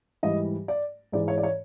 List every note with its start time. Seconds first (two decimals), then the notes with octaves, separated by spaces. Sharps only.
0.23 G#2 E3 G3 D#5
0.68 D5
1.12 G#2 E3 G#3 D5
1.28 C#5
1.38 D5
1.43 C#5